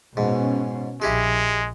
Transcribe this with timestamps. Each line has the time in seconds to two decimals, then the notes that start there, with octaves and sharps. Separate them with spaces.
0.17 G#2 B2 C#4
1.02 A#1 G#3 E4 G4 G#4